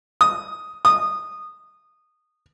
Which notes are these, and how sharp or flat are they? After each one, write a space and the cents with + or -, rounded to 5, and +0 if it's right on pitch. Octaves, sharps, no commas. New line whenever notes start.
D#6 +5
D#6 -15